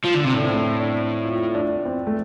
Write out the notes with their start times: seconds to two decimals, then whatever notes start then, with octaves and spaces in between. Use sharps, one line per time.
0.05 F3
0.15 D3
0.25 C3
0.34 A2 D4
0.44 C4
0.53 A3
0.63 C4
0.80 D4
1.25 F4
1.54 D4
1.85 C4
2.07 A3